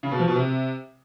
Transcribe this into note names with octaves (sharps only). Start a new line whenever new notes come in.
C#3
B2
F3
B2
C3